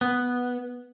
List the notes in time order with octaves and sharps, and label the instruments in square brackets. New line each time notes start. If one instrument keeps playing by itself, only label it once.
[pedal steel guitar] B3